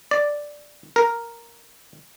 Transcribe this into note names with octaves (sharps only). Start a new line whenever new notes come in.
D5
A#4